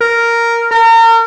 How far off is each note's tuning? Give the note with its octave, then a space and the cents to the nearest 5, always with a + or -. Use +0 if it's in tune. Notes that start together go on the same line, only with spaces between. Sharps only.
A#4 -5
A#4 -35